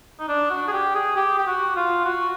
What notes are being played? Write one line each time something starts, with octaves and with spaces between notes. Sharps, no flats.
D#4
D4
F#4
G#4
G4
G#4
G4
G4
F#4
F4
F#4